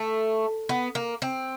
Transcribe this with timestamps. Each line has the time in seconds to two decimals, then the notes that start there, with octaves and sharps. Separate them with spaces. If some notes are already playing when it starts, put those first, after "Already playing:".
Already playing: A3
0.69 B3
0.95 A#3
1.22 C4